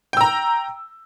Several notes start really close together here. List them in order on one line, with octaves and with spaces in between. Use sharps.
G5 E6 A#5